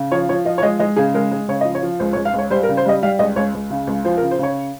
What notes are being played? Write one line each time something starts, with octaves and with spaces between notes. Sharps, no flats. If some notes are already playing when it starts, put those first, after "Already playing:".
Already playing: C#3
F3 C#5
F3 C#5
F3 D#5
C#5
G#3 D#5
G#3 D#5
C#3 G#4
G#3 A#4
G#3
C#3 C#5
F3 D#5
C#5
F3
C#2 C5
C#5
C#2
F5
C#2
C#5
G3 C5
A#4
C#3
C5
G3 D#5
G3 F5
C#2 D#5
C#2 C#5
C#2
C#3
C#2
F3 C5
A#4
C#3
C5
C#3 C#5